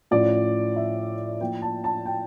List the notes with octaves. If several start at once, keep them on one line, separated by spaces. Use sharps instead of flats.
A2 F3 C#4 F4 D5
E5
F3 A#3 E4 G5
A5
A5
G5